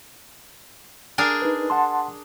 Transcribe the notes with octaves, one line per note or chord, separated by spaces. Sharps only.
D4 G#4 A#4
D#4 B4
F#5 A5 C6